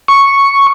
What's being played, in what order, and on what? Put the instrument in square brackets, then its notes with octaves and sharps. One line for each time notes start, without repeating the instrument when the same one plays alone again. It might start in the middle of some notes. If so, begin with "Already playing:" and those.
[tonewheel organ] C#6